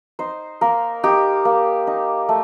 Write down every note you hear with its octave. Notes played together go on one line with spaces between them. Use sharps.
D#4 C5
A#3 A#4
D#4 G4
A#3
D#4
A3